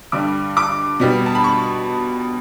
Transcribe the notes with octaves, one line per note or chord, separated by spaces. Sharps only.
G2 D3 G3 D6
D6
B2 G3 B3
A5
B5
C#6